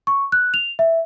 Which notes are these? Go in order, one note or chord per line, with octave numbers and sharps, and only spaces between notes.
C#6
F#6
F7
E5